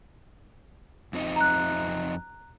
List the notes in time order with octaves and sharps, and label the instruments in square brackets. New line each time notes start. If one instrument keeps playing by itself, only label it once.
[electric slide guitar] F2 C4 D#4
[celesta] A#5 F#6